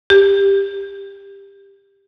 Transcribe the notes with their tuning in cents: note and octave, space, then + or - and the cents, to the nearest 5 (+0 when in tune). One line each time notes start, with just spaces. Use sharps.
G4 +15